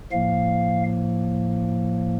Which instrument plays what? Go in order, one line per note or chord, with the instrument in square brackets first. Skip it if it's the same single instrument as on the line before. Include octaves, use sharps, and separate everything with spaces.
[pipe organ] A2 F3 A#3 F5